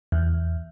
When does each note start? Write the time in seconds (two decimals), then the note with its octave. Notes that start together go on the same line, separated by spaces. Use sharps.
0.12 E2